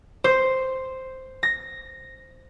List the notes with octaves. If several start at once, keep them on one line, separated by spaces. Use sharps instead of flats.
C5
A#6